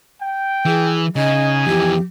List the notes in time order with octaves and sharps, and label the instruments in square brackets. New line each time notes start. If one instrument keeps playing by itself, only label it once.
[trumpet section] G5
[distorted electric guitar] E3 [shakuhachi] G#4
[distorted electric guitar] C#3 [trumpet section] D#4 G#5 [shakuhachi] D#5
[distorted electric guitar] F2 E3 [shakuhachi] G4